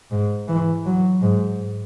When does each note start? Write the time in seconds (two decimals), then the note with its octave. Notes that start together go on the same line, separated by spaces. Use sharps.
0.11 G#2
0.48 E3
0.85 F#3
1.22 G#2